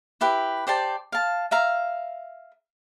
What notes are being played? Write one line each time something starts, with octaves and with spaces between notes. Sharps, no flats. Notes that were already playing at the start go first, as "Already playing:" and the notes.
E4 G4 B4
G4 C5 D5 A5
F5 A5
E5 F5 A#5